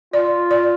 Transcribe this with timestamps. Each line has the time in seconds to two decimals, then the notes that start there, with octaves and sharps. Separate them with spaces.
0.13 F4 D5
0.51 D5